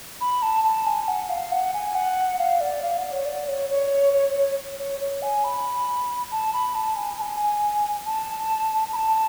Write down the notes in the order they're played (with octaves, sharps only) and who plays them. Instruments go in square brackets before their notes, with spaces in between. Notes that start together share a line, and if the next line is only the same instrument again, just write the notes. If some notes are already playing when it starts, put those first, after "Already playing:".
[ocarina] B5
A5
A5
G#5
F#5
F5
F#5
G#5
F#5
F5
D5
F5
F#5
C#5
D5
C#5
C#5
C#5
C#5
C#5
C#5
G#5
B5
A5
B5
A5
G#5
A5
G#5
A5
B5
A5